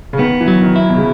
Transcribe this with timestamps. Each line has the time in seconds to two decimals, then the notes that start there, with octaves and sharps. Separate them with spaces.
0.13 C#3
0.19 D#3 B3
0.41 E3
0.48 F#3
0.61 D#3
0.76 E4
0.89 B2
0.97 C#3